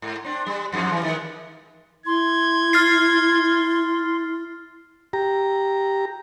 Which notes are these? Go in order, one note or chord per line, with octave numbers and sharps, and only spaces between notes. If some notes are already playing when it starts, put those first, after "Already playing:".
G#2
C4 D4
G3
F2 G#2 F3
E3 G3
D#3 G#3
E4 C6 G#6
F6 A6 C7
G4 A#5